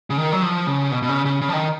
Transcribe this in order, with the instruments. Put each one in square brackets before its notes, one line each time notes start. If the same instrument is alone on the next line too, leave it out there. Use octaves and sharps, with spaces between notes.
[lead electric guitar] C#3
D#3
F#3
F3
C#3
B2
B2
C#3
C#3
C#3
F3
D#3